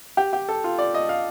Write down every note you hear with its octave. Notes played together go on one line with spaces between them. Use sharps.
G4
G4
A4
F4
D5
D#5
F5